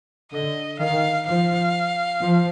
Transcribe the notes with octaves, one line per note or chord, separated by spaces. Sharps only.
D3 D#5
D#3 F5
F3 F5
F3